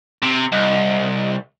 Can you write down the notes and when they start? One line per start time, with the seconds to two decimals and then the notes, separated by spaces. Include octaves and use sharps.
0.22 C3
0.52 C2 D#5